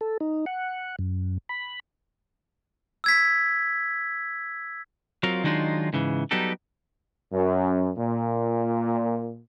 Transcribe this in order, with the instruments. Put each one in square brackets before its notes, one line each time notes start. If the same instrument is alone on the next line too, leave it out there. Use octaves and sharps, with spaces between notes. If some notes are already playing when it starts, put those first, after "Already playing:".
[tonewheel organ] A4
D#4
F#5
F#2
B5
[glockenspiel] E6 G#6 B6
[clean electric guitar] F#3 C4 F4 A#4 F5
D#3 F#3 G#3 D4 D#4 F4
G#2 C#3 E3
F#3 G3 B3 D#4 G4 A4
[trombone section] F#2
A#2